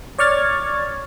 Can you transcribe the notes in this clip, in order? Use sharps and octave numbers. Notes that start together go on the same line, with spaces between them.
C#5 D5 C#6 F6 G#6 A6